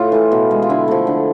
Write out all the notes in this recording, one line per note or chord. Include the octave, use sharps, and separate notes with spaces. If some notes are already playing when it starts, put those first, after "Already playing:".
Already playing: A2 F4
E3 A3
B2
G#3
F4
D3 E4
F3 A3
D3